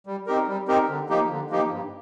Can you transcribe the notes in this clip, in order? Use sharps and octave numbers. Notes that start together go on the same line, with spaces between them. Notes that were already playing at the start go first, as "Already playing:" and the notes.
G3
C4 D#4 G4 A#4
G3
C4 D#4 G4 A#4
D3
F3 A#3 D#4 G4
D3
F3 A#3 D#4 G4
G2